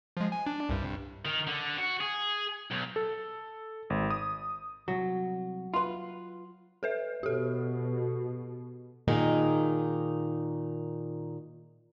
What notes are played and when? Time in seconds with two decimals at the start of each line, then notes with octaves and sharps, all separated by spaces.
0.17 F3 G#3
0.32 G#5
0.46 D4
0.69 C2 G2
1.25 D#3
1.47 D3
1.78 F#4
2.00 G#4
2.71 B1
2.96 A4
3.90 G#1
4.10 D#6
4.88 C2 F#3
5.74 F4 B4 C6
6.83 A4 B4 E5
7.23 B2 G4 A4
9.08 A#2 D#3 D#4 G#4